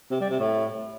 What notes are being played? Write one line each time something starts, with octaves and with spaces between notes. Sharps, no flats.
C3
G3
C3
A2